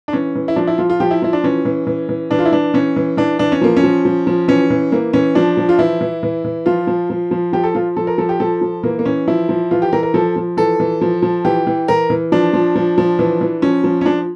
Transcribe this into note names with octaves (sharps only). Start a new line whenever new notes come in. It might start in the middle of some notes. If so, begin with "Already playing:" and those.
D4
E3 C#4
E3
E4
F3 D4
E4
F3 F4
F4
F3 G4
E4
F3 E4
D4
E3 C#4
E3
E3
E3
E3 D4
F4
E4
E3 D4
E3 C#4
E3
E3 D4
E3 D4
C#4
F3 A#3
C#4
F3
F3
F3
E3 C#4
E3
E3 A#3
E3 C#4
F3 D4
F3
F4
E3 E4
E3
E3
E3
F3 F4
F3
F3
F3
F3 G4
A4
F3 F4
F3 A4
A#4
F3 A4
G4
F3 A4
F3
E3 A#3
A#3
E3 C#4
F3 E4
F3
E3 F4
G4
E3 A#4
A#4
F3 A4
F3
E3 A4
E3
F3
F3
E3 G4
E3
E3 A#4
E3
F3 D4
F3
F3
F3
E3
E3
F3 C#4
F3
C#4
F3 D4